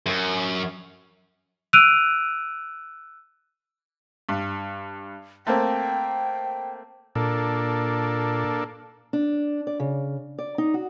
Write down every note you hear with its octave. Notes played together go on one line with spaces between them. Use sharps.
F#2
E6 F#6 D7 D#7 F7
G2
A3 A#3 C4 G5
A#2 A#3 D4 A4
D4
D5
C#3
D5
D#4
F#4